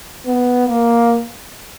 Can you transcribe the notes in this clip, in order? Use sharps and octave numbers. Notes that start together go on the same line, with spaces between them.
B3
A#3